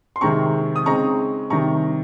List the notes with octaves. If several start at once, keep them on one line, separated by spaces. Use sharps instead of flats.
C6
C3 D#3 G#3 C4 A#5 C#6
D#6
C#3 G#3 C4 D#4 A#5 C#6
C3 D#3 G3 A#5 C#6